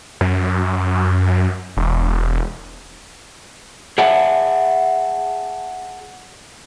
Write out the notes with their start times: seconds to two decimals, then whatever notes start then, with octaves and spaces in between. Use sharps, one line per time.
0.21 F#2
1.77 E1
3.98 G#4 E5 F#5 A5